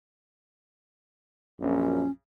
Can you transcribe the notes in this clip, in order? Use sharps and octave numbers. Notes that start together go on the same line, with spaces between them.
A#1 F#2 C#4